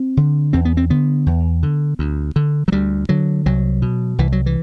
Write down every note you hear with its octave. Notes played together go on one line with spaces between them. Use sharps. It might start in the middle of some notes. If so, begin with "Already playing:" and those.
Already playing: C4
D3
E2 C4
B3
C4
D3 B3
E2
D3
D2
D3
F#3
D2 G3
D3 F#3
C2 F#3
B2
C2 E3
F#3
E3